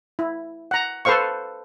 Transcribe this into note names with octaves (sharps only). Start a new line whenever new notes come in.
E4
F#5 A#5
A4 B4 C5 F5 C#6